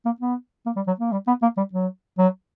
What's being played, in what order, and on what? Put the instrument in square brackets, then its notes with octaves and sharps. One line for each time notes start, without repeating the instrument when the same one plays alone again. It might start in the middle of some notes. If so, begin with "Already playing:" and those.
[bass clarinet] A#3
B3
A#3
G3
F#3
A#3
G3
B3
A#3
G3
F#3
F#3